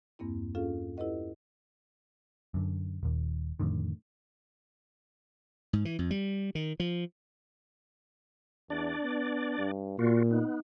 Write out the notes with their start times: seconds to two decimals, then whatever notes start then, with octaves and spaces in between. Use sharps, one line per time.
0.19 E2 G2 A#3 C4 E4
0.55 C#4 F4 G#4 A4 F5
0.97 E4 G4 A4 B4 D#5 F#5
2.54 F#2 D3
3.03 D#1 D#2
3.59 F2 A2 D3 D#3
5.73 G#2
5.85 E3
5.99 F2
6.11 G3
6.55 D#3
6.80 F3
8.70 E2 D4 D5
9.03 B3
9.58 G2
9.99 A#2 A#3 F4 F#4
10.31 B3 D#4